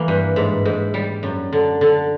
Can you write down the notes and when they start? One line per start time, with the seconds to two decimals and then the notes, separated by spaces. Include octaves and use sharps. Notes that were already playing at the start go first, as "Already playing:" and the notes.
Already playing: E3 A#3
0.08 G2
0.36 G#2
0.65 G#2
0.94 G3
1.23 F#2
1.53 D3
1.81 D3